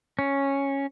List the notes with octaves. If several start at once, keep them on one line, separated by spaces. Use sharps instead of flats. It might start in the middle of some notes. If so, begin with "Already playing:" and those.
C#4